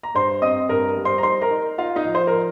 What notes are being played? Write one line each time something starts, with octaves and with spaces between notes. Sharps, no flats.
A#5
G2 C5 C6
C4 D#5 D#6
G2 A#4 A#5
G3
C5 C6
A#5
D#4 C5 C6
A#4 A#5
D#4
D#4 F4 F5
D#4 D#5
F3
C5
A#4
F3